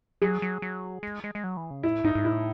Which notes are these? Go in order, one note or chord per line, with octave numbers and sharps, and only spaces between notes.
F#3 G#4
F#3
F#3
G#3
G#3
G#3
F#3
E3
C#3
A2 E4
G#2 D#4
G#2
A2 E4